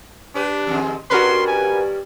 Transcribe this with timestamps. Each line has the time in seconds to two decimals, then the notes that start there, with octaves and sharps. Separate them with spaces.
0.35 D4 G4 B4
0.67 E2 D#3 G#3
1.10 G2 G3 C#4 F#4 A#4 B4 C6
1.47 G#5